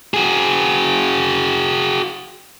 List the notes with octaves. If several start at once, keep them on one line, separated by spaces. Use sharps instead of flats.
F#4 G#4